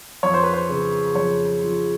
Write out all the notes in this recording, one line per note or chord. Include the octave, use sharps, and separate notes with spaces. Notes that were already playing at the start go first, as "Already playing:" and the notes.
F2 C#5
C5
B4
C5
C#3
F2 C#5
F3